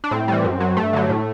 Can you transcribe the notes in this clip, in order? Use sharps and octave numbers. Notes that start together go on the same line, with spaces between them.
D4
A2 C4
E3 G3
F#2
F#3
G2 A3
D3 F#3
A2